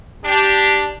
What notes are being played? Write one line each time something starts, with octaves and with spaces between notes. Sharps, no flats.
D4 G4